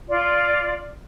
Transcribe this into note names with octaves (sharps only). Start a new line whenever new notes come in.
F4 D5